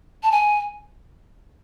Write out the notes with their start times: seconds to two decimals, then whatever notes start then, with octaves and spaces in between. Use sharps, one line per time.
0.23 A5
0.32 G#5